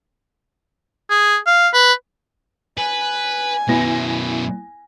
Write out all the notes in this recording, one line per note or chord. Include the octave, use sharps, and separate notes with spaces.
G#4
F5
B4
B4 G#5
F#2 B2 B3 E4 A#6